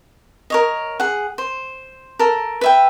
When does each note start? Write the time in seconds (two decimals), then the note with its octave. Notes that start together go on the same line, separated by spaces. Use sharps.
0.50 A#4 C#5 D#5
1.00 G#4 F#5
1.38 C5
2.19 A4 A#4
2.61 B4 E5 G5